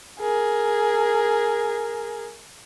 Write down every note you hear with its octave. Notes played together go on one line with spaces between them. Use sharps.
G#4 A#4